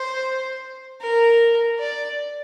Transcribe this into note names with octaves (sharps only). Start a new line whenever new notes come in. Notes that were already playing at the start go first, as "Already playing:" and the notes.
Already playing: C5
A#4
D5